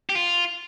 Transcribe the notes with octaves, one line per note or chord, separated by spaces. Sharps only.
G4
F4